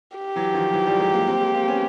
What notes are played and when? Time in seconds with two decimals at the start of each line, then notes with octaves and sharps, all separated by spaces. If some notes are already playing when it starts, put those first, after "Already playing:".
0.18 G4
0.36 E3 F#3
0.54 D#3 F3
0.72 E3 F#3
0.86 F3 G3
1.00 F#3 G#3
1.14 G#3 A#3
1.28 A#3 C4
1.41 G#3 A#3
1.54 A#3 C4
1.68 B3 C#4